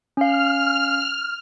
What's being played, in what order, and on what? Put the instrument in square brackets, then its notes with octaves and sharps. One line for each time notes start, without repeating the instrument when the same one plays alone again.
[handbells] C#4 F5 [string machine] F6